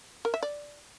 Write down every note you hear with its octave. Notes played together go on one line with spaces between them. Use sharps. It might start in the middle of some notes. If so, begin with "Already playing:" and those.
A#4
E5
D5